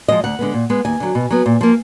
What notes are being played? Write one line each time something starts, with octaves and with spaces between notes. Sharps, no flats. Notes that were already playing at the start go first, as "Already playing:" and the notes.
F3 G#3 D#5
D2 F#5
D3 G#3 B3
A#2
G#3 B3
D#2 G#5
D3 F#3
B2
F#3 B3
A#2
F3 A#3